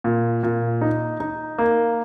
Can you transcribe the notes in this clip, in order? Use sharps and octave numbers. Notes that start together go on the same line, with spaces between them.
A#2
A#2
D#4
D#4
A#3